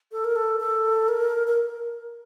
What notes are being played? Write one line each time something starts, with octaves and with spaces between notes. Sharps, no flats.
A4
A#4
A4
A4
A#4
A#4